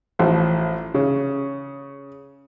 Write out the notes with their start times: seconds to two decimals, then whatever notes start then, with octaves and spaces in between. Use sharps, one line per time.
0.19 A1 F3
0.94 C#3